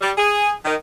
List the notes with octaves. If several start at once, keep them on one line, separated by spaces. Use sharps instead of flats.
G3
G#4
D#3